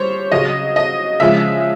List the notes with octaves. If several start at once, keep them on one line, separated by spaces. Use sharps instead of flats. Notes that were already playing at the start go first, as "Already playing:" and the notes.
Already playing: G3 C5 C#5
C#3 F#3 D#5
D#5
C#3 F3 G#3 E5